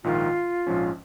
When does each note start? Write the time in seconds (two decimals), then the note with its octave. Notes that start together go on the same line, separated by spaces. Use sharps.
0.04 A#1 G#2 D#3 F4
0.67 A#1 G#2 F3 C#4